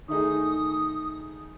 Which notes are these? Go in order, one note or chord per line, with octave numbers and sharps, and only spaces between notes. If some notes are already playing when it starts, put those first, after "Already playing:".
D#3 A3 D#4 G#4 D#6